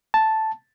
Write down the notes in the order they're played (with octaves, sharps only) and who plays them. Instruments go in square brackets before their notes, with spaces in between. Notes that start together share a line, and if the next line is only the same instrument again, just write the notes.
[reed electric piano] A5